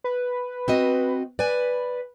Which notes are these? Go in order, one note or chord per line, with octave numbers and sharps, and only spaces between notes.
B4
C4 F#4 D#5
B4 D5 G#5